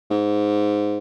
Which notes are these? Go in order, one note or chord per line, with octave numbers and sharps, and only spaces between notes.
G#2